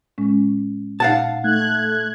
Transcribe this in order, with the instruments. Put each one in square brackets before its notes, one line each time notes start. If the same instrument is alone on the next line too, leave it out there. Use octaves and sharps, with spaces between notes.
[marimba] A2 G#3 C#4
[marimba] A#2 D#4 [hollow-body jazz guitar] F5 F#5 A5
[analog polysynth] A3 F#6 G#6 [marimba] D#4